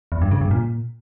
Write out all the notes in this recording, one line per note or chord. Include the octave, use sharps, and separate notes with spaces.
E2
G2
C#3
G2
A#2